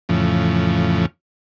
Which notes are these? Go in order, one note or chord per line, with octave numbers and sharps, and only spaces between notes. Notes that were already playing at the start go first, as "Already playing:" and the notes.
F2 A2 C#3 E3 F3